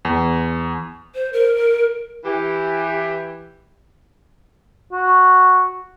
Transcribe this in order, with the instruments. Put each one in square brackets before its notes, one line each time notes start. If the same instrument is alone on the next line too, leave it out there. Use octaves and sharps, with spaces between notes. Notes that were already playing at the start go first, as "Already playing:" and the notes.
[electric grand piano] E2
[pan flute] C5
A#4
[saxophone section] E3 G4
[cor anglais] F#4